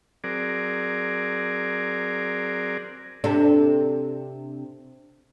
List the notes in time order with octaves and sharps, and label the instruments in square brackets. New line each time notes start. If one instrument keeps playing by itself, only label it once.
[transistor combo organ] F#3 C4 G#4 A#4 D5
[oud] C3 D4 A4